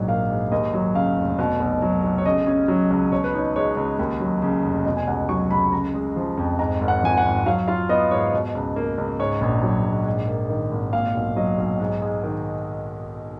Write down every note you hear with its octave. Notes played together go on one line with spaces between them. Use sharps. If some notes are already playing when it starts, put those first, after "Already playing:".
Already playing: A#1 G#2 F#3
A#3 F5
G#2
D#2 D#5
F#3
C#3 F5
F1
B2
B1
F#3
B1
C#5
C#3 D#5
C#4
F#3
C#2
B2 C#5
B4
D#4 C#5
G#3 C#5
C#2
D#2
F#3
C#3
F1
B2 D#5
G#5
C#2 F#5
F#3 C#6
C#2 B5
C#3 A#5
G#3
F3
F2
G#2 A#5
G#1
F#5
F3 G#5
F#5
G#1
F#3 F5
F4 F5
B3 D#5
G#2 C#5
B2
C#2
A#3
C#2
G#2 C#5
A#1
F#3
A#1
G#2
A#3
D#3
G#1
A#2 F5
B1
F#3 D#5
B1
G#2
G#3
D#3